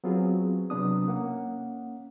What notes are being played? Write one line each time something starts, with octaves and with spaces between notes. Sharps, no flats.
F#3 B3 C4 F4 F#4 G#4
C3 F#3 B3 D4 D#6
A#3 C#4 F#5